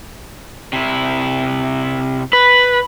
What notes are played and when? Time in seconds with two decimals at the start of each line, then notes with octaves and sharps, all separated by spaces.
0.73 C3 E4
2.33 B4 B5